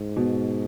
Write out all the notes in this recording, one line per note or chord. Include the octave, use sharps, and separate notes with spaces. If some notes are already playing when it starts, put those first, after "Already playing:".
Already playing: G#2
B2